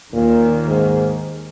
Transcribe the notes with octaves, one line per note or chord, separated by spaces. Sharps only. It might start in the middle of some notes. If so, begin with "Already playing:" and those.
D#2 A#2 D#3 A#3
G#2